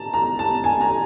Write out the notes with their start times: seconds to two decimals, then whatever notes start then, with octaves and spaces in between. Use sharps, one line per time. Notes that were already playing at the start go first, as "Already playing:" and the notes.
Already playing: A5 A#5
0.14 A#5
0.39 A5
0.64 G#5
0.81 A#5